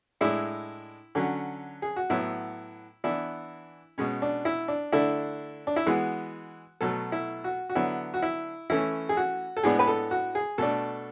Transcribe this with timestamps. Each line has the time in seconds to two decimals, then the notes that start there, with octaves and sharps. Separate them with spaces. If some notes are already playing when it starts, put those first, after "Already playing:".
0.21 A2 G#3 D4 E4
1.15 D3 F#3 C#4
1.82 G#4
1.96 F#4
2.10 A2 F#3 B3 E4
3.04 E3 B3 D4 E4
3.98 B2 G#3 C#4
4.22 D4
4.45 E4
4.68 D4
4.92 D3 A3 D4 E4
5.67 D4
5.76 E4
5.86 E3 G#3 B3 F#4
6.81 B2 F#3 A3 A4
7.12 E4
7.44 F#4
7.69 F#4
7.75 D3 F#3 B3 D4 E4
8.14 F#4
8.22 E4
8.70 E3 A3 C#4 E4
9.09 G#4
9.17 F#4
9.57 A4
9.63 A2 G#3 B3 D4 G#4
9.79 B4
9.87 A4
10.11 F#4
10.35 G#4
10.58 B2 A3 D4 A4